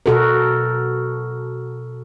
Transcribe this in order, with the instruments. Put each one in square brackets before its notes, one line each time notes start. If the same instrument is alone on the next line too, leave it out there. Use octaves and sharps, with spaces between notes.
[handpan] B2 F#4 A4 A#4